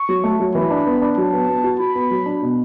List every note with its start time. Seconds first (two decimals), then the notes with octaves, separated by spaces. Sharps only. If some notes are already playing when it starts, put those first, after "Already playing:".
Already playing: C#6
0.09 F#3
0.24 A3
0.40 F#3
0.55 E3 B5
0.71 D4
0.86 B3
1.02 D4
1.17 F#3 A5
1.33 B3
1.48 B3
1.64 F#4
1.80 F#4 B5
1.95 B3
2.11 F#3
2.26 D4
2.42 B2